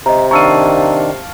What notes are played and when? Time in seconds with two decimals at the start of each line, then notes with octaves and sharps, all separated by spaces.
0.06 C3 D#5 A#5
0.31 D#3 D4 F5 A5 A#5 C#6 E6 D#7